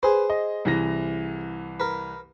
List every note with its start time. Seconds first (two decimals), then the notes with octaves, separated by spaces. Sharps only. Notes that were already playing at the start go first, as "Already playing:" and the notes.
0.03 G#4 B4 C5
0.30 D#5
0.65 C2 E3 A#6
1.80 A#4 B4